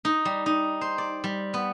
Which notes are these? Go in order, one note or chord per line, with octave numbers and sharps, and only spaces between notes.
D#4
G3
D#4
C5
D5
G3
B3